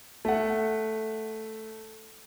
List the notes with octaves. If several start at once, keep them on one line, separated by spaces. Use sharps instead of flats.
A3 F#5